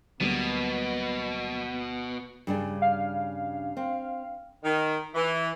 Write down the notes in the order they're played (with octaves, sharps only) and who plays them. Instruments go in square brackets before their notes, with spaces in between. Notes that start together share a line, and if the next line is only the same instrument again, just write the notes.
[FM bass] D2 [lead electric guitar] B2 [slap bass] F#3 G3 A#3 [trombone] B3
[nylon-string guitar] G2 C#3 D4
[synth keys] F5
[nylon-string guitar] C4
[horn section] D#3
E3